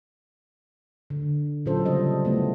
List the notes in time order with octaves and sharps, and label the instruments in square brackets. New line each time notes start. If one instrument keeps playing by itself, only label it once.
[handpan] D3
A#2 F#3 C#4 F4 A4 C5
C#3 G3 D#5
A3 B3 E4